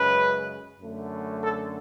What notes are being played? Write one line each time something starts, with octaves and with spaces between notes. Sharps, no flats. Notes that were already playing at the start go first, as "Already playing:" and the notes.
Already playing: F#2 C#3 G#3 B4
F#2 D3 A3
A4